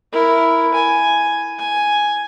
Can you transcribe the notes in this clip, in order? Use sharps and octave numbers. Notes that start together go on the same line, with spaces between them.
E4 A#4
G#5
G#5